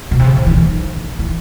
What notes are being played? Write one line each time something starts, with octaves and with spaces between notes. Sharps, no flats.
B2
C3
C#3
D3
E3
D#3
E3